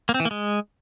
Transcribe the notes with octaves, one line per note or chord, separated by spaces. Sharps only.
A#3
C4
E3
A#3
G#3